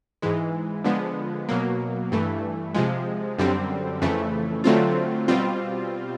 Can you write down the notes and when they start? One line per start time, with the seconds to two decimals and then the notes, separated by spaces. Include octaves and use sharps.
0.22 G#2 E3 G#3
0.84 D3 F3 G#3 B3
1.49 B2 F#3 A#3
2.12 G2 E3 A3
2.75 C3 F3 G#3
3.39 F#2 D3 G3 C4
4.02 F2 C#3 E3 A3
4.64 D3 F#3 A3 C4 F4
5.28 B2 G3 C4 F4